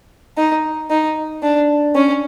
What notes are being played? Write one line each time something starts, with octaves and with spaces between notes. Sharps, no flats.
D#4
D#4
D4
C#4